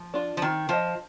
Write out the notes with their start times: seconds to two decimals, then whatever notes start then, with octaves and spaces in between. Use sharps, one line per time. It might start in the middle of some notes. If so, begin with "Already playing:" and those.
Already playing: F3
0.14 D4 F4
0.37 F3
0.42 D#3 C4
0.69 F3 F4 C5 D#5